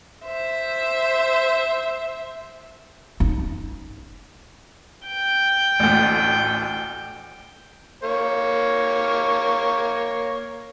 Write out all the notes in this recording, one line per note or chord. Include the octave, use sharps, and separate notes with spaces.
C5 E5
C#4 D#4
G5
A1 D2
A#3 C#5